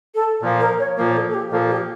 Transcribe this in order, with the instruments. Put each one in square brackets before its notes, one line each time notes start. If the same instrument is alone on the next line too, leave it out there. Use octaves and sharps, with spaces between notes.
[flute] A4
[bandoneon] A#2 F3 A#3
[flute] A#4
C#5
[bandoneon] A#2 F3 A#3 [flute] A#4
[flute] A4
A4
G4
[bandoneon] A#2 F3 A#3 [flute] A4
[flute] G4